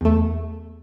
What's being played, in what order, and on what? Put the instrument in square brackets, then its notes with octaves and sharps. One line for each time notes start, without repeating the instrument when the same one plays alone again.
[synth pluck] E2 A3